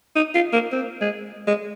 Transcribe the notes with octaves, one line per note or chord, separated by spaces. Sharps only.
D#4
F4
A#3
C4
G#3
G#3